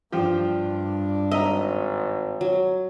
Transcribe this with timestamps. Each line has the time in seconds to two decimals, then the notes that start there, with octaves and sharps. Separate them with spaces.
0.12 G2 F3 D4 F4 G4
1.31 G#1 D#5 E5 A#5
2.41 F#3